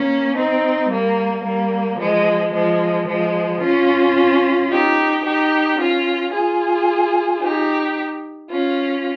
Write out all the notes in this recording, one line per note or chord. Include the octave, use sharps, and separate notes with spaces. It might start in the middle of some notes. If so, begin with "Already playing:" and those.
Already playing: A#3 C#4
C4 D#4
G3 A#3
G3 A#3
F3 G#3
F3 G#3
F3 G#3
C#4 F4
D#4 G4
D#4 G4
C#4 F4
F4 G#4
D#4 G4
C#4 F4